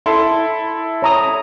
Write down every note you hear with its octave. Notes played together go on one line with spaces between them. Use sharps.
E4 A4 C6
C#5 A#5 D#6